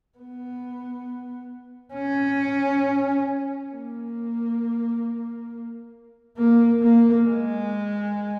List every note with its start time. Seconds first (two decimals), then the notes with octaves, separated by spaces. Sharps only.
0.18 B3
1.94 C#4
3.72 A#3
6.38 A#3
6.82 A#3
7.26 G#3